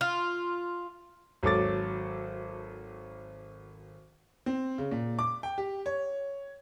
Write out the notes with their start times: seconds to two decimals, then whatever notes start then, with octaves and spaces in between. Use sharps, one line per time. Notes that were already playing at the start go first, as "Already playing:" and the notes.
0.01 F4
1.43 G#1 F#3 A4 D6 A6
4.46 C4
4.78 C#3
4.91 A#2
5.19 D6
5.43 G5
5.58 G4
5.86 C#5